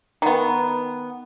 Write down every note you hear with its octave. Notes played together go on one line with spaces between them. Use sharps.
D#3 B3